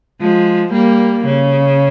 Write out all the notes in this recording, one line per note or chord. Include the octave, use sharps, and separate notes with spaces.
F3 G#3
G3 A#3
C#3